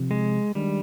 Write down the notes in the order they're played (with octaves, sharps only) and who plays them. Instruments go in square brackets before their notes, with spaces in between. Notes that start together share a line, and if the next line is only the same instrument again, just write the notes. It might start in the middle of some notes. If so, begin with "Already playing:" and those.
Already playing: [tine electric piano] C3 F3 C4
[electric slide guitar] G#3
[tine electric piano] D#3 G#3 D4 [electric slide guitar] G3